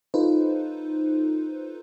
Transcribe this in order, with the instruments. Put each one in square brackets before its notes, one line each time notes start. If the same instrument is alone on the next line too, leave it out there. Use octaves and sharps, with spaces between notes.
[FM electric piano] D#4 F4 A4 B4 C5